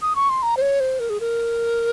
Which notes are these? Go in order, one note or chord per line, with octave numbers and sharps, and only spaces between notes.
D#6
C#6
C6
A#5
C5
C#5
C5
A#4
G#4
A#4